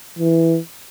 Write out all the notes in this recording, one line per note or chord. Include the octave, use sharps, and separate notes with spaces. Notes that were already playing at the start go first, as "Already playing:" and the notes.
E3